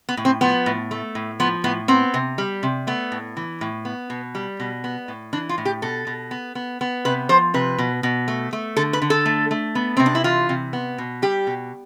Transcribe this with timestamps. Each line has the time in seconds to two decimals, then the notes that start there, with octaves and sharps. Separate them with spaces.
0.09 B3
0.17 A2
0.25 C4
0.41 F3 B3
0.66 A2
0.91 A3
1.15 A2
1.40 F3 B3
1.64 A2 B3
1.88 B3 C4
2.14 C3
2.38 G3
2.63 C3
2.87 A3 B3
3.12 A2
3.37 E3
3.61 A2
3.85 B3
4.10 B2
4.35 G3
4.60 B2
4.84 B3
5.08 A2
5.33 E3 D4
5.49 F4
5.58 A2
5.65 G4
5.82 B2 A4
6.07 B2
6.31 B3
6.55 B3
6.81 B3
7.05 C3 B4
7.29 F3 C5
7.54 C3 B4
7.78 B2
8.03 B2
8.28 A3
8.53 A3
8.76 D3 A4
8.93 B4
9.02 D3
9.10 A4
9.26 A3
9.51 A3
9.75 B3
9.97 C3 C4
10.06 D4
10.15 E4
10.24 E3 F4
10.49 C3
10.73 B3
10.98 B2
11.22 G3 G4
11.47 B2